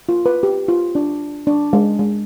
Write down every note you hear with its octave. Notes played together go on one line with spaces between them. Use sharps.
F4
B4
G4
F4
D4
D4
G#3
G#3